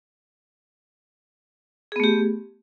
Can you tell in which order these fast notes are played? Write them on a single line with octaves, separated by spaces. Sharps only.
G#4 B3 A3 G4